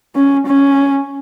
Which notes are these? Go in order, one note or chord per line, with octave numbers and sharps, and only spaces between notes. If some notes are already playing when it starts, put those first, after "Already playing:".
C#4
C#4